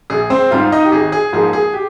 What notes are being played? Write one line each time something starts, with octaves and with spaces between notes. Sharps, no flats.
A#1 G#4
C4 C5
G#2 G3 C4 D#4 F4 F5
D#4 D#5
G4
G#1 G#4
G#4
G#2 F3 A#3 D#4 G#4
G#4
G4